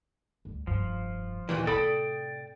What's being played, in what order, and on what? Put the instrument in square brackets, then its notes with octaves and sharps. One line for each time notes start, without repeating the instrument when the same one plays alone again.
[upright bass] D2 G3
[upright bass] F1 G2 [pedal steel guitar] F3
[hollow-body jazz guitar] D#2 A#2 E3
[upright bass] A2 C3 [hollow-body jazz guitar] A4 B5 [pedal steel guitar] D5 G5 D#6